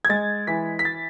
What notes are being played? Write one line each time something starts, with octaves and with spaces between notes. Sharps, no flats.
G#6
G#3 A6
E3 B6
B6
A6